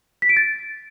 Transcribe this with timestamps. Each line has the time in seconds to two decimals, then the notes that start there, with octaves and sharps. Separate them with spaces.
0.22 B6
0.29 D7
0.37 A6